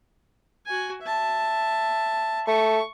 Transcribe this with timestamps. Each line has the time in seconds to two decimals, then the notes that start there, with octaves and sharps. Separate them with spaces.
0.66 F#4 G#5
1.03 E5 A5
2.47 A3 C#6